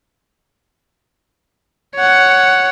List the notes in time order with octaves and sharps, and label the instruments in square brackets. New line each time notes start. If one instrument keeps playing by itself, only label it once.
[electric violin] C#5 F#5